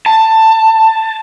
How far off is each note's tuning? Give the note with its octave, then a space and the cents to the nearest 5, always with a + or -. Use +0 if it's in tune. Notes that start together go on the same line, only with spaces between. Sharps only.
A5 +15